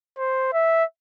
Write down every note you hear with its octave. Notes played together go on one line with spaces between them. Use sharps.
C5
E5